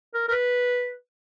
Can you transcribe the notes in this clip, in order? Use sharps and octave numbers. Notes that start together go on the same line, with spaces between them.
A#4
A#4
B4